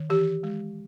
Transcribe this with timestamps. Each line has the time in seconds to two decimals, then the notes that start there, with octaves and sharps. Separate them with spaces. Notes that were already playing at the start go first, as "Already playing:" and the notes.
Already playing: D#3
0.10 E3 G4
0.43 G#3